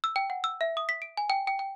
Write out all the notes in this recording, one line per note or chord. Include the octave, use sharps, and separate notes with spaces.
E6
G5
F#5
E6
E5
D#6
B6
D7
G#5
G5
G5
G5